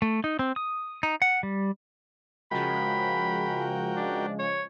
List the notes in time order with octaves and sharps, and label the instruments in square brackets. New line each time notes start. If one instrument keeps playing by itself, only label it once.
[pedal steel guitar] A3
D#4
C4
D#6
D#4
F#5
G3
[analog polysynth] C#3 F3 G#3 [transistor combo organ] F#4 A#4 G5 [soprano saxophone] B5
[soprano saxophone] D4
C#5